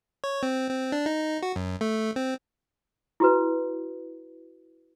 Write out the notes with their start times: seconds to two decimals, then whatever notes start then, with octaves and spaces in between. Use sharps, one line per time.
0.24 C#5
0.43 C4
0.69 C4
0.92 D4
1.06 D#4
1.43 F#4
1.56 F#2
1.81 A3
2.16 C4
3.20 E4 F#4 B4